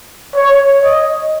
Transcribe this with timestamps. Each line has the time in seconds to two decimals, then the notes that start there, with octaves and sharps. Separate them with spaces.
0.35 C#5
0.84 D#5